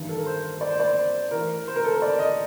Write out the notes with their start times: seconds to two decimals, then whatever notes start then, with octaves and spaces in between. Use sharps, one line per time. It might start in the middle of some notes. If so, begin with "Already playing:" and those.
Already playing: A1 G2 D#3
0.09 A4
0.17 A#4
0.26 C5
0.61 D5
0.70 C5
0.80 D5
0.87 C5
1.31 A1 A2 A#4
1.68 C5
1.76 A#4
1.84 A4
1.93 A#4
2.02 D5
2.19 D#5